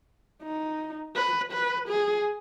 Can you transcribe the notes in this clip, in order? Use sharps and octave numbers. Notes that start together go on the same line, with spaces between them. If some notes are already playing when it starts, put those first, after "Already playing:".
D#4
B4
B4
G#4